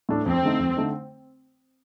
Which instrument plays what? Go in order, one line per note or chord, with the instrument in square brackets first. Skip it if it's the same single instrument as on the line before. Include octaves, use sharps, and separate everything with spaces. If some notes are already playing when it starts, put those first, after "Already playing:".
[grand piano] A2 A3 D4 A4
[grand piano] F2 [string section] C4
[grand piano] D3 A3 D#4
F2
D3 A3 D#4